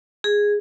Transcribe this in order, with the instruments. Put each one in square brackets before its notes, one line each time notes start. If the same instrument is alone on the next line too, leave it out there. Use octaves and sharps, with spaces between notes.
[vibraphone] G#4